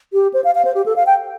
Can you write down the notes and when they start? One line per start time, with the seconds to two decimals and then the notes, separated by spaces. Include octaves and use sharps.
0.13 G4
0.34 C5
0.44 F5
0.55 F5
0.65 C5
0.75 G4
0.86 A4
0.96 F5
1.06 G5